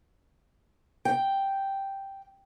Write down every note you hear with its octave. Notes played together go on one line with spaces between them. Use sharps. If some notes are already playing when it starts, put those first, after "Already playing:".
G5